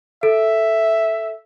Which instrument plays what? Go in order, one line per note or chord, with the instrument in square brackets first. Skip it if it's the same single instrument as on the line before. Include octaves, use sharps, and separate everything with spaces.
[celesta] A4 [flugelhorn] E5